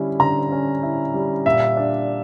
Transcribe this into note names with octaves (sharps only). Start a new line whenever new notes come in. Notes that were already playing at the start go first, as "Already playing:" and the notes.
Already playing: D3 G3 C#4 E4
D3 A#5
C#4
E4
G3
A#2 E5
D4